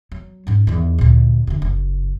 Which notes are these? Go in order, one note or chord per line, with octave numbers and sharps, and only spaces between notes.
F#3
G#2 C#4
E2 D#3
D2 A#2
F#2 D3
F#1